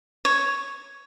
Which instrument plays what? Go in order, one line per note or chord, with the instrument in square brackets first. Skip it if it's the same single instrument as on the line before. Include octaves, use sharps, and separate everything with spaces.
[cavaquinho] C#5